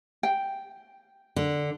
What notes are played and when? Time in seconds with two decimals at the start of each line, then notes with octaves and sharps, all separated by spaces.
0.23 G5
1.36 D3